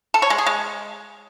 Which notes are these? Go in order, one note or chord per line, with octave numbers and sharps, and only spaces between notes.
A4
C#5
G#3
G#4
G#3